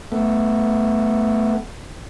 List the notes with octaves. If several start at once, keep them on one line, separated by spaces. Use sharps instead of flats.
A3 B3